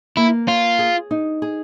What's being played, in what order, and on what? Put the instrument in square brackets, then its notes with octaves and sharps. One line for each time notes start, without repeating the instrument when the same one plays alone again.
[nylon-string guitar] A#3 [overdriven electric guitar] E4
[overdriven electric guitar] F4 [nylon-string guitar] C#5
[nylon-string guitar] G#4
D#4
G#4